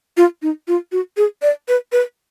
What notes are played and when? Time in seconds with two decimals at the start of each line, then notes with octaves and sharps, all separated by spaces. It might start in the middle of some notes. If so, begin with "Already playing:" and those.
0.17 F4
0.42 D#4
0.68 F4
0.92 F#4
1.17 G#4
1.42 D5
1.68 B4
1.92 B4